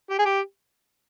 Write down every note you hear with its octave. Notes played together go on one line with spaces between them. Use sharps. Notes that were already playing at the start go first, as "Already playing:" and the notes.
G4
G#4
G4